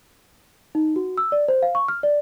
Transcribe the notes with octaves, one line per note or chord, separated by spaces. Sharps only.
D#4
F#4
E6
D5
C5
F5
C#6
F6
D5